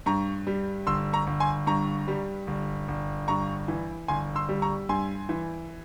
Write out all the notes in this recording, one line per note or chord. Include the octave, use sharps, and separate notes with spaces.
G2 A#5 C#6
G3
G1 C6 E6
A#5 C#6
G1
G#5 C6
G2 A#5 C#6
G3
G1
G1
G2 A#5 C#6
E3
G1 G#5 C6
C6 E6
G3
A#5 C#6
G2 G#5 C6
E3